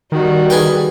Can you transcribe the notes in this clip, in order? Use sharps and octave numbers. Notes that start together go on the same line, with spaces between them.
D#3 G3 F#4
G#4 B4 G5